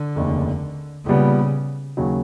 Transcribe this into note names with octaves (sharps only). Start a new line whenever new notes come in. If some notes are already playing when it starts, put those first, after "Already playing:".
Already playing: D3
F1 D#2 C#3
A#1 A#2 C#3 G3 B3
D#2 C#3 F#3